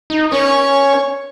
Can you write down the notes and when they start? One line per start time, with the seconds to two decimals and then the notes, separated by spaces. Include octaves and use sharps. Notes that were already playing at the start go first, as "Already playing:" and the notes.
0.10 D#4
0.32 C#4 C#5